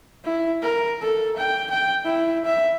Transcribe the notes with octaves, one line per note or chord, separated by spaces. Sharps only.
E4
A#4
A4
G5
G5
E4
E5